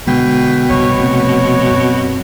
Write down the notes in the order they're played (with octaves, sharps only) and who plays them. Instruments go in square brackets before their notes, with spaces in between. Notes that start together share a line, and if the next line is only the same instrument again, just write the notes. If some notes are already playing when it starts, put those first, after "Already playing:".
[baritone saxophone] B2 [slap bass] D3 G#3 [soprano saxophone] G5
[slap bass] B1 G2 C#3 [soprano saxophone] C#5
[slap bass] F1 A3 C4
F#2 C4